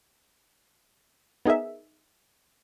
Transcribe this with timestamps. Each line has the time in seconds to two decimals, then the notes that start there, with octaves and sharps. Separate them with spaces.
1.46 B3 D#4 G#4 A#4 E5